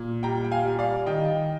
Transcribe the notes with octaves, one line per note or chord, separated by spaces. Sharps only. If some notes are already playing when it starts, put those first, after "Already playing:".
Already playing: A#2
G3 G5 A#5
G5
F5 G#5
G3
D5 F5
D#3 D#5 G5